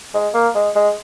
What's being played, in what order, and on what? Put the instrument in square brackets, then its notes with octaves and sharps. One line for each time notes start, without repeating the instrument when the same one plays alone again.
[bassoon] G#3
A#3
G#3
G#3